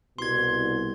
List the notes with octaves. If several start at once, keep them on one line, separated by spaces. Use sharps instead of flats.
C2 B2 C6 G#6